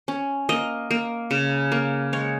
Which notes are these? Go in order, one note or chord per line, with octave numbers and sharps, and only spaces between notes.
C#4
A#3 D#5
A#3
C#3
A#3
G#3 C#5